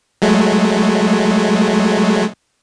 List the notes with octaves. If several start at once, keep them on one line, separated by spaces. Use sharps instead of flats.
F#3 G#3 A3